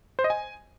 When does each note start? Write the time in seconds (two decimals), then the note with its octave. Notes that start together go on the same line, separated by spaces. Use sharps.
0.19 C5
0.24 D#5
0.30 G#5